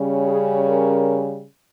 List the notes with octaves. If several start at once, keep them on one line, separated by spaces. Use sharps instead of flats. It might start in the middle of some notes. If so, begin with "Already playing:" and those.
Already playing: C#3 G3 C#4
G#4
A#4